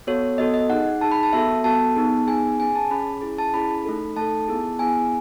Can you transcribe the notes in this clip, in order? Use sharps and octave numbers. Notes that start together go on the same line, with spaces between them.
B3 F#4 A4 C#5
B3 F#4 A4 D#5
D#5
D#4 G#4 F#5
D#4 G#4 A5
B5
A5
B3 F#4 A4 E5
B3 F#4 A4 A5
B3 D#4 G#4
B3 D#4 G#4 G#5
C#4 G#4 G#5
A5
C#4 G#4 B5
C#4 E4 G#4
A5
C#4 E4 G#4 B5
A3 D#4 A4
A3 D#4 A4 A5
B3 E4 G#4
B3 E4 G#4 G#5